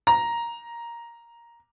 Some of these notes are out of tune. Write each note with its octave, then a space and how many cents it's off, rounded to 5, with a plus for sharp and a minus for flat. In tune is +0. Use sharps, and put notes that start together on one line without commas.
A#5 +5